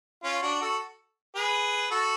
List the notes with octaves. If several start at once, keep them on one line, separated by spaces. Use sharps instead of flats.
C#4 F4
D4 F#4
F#4 A4
G#4 B4
F#4 A4